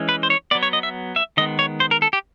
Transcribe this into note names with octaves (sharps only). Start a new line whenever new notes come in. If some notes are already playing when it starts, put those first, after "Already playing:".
Already playing: E3 G#3 C#4
B4
C5
C#5
F#3 B3 D5
C#5
D#5
E5
E5
D#3 G#3 B3 D#5
C#5
C5
A#4
A4
G4